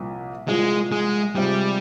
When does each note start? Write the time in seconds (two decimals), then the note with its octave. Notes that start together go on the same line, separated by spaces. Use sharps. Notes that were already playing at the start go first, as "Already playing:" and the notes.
Already playing: C2 A#2 F3
0.48 C2 A#2 F3 G#3
0.92 G#3
1.35 C3 F3 G3 G#3